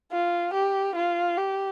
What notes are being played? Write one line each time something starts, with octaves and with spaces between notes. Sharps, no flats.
F4
G4
F4
G4